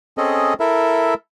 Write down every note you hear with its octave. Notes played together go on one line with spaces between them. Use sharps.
C4 C#4 G#4 A4 D#5
E4 A4 A#4 E5